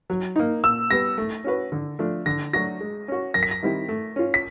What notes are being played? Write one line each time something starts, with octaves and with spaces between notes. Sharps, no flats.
F#3
A#3 D#4
A#2 E6
G3 B3 A#6
A3
C#4 F#4 B4
D3
F3 A3 D4
D3 A#6
F#3 A3 D4 F#4 A#6
G#3
C#4 F#4
F#2 A#6
B6
A#6
D#3 G3 C4 E4
A3
C#4 F4
B6